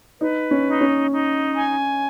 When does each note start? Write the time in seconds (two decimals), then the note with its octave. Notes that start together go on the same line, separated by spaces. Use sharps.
0.21 D#4 B4
0.51 C#4
0.67 D#4
0.81 C#4
1.11 D#4
1.55 G#5